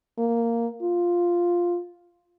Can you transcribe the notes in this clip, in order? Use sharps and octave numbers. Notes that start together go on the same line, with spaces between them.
A#3
F4